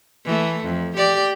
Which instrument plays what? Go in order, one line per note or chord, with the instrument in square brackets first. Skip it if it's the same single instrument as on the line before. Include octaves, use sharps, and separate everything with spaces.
[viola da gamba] E3 A3
F2
G4 D5